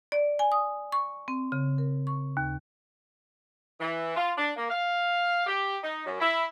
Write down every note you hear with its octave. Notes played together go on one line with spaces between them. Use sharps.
D5
G#5
D#6
C#6
C4
C#3
A#4
C#6
D#2
E3
F4
D4
A#3
F5
G4
D#4
F#2
E4